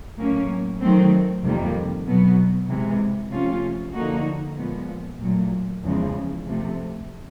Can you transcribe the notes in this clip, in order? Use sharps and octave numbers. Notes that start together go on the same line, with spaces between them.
A2 F#3 A#3 C#4
D#3 F#3 A3 C4
F2 C3 D#3 G3 A#3
B2 F#3 B3
C3 E3 G#3
C3 F3 A3 C#4 F4
D3 F3 A#3 D#4 F#4
A#2 F3 G#3 B3
A#2 F#3 A3
E2 C#3 F3 G#3
C3 F3 A3